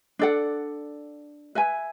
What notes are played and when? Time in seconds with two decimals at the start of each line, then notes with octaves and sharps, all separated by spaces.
0.19 D4 A4 D5 F#5
1.55 B4 E5 G#5